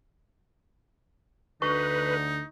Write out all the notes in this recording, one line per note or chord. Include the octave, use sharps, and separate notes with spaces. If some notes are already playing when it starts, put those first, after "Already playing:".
D2 D3 D#4 B4 C#6